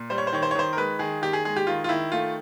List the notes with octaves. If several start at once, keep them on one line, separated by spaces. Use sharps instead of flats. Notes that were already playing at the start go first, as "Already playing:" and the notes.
Already playing: A#2
G3 C5
C#5
C5
D#3 C#5
C5
C#5
D#3 C5
A#4
G#3 B4
D#3 G#4
D#3 G4
G#4
G#3 G#4
G4
D#3 F4
F4
D#3 E4
A3 F4